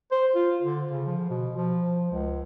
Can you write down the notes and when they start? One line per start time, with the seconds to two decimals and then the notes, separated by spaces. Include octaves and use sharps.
0.12 C5
0.35 F4
0.62 D3
0.92 C#3
1.06 F3
1.30 B2
1.57 F3
2.12 C#2